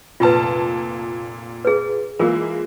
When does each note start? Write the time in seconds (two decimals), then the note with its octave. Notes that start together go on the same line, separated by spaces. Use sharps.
0.20 F1 A#2 F4 B4 A5
1.65 G#4 B4
2.19 E3 G#3 A#3 F4 G#4 A#4